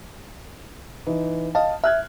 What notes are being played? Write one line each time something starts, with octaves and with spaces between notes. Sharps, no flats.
E3 D#4
D#5 F5 A5
E5 F6 F#6 G#6